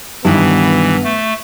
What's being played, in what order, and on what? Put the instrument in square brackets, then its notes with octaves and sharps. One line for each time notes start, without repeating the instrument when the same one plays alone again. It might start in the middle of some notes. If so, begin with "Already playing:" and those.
[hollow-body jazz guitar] B1 D#3 E4 [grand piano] G2 [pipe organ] E3 [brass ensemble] B3
[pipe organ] A3